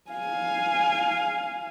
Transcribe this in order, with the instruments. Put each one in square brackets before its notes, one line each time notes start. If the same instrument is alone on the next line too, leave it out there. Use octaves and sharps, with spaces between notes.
[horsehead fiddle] F5 G#5